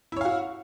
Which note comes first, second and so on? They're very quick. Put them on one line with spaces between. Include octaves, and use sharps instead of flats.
E4 C#5 F5 F#4